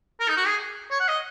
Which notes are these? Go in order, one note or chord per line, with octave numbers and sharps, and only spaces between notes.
A#4
D#4
F#4
G#4
C#5
F#5
D#5